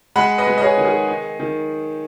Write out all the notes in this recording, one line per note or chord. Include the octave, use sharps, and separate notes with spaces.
G#3 F#5 B5
B4 D#5
G#3
D#5
G#4 C#5
D#3
G#4
D#4
D#3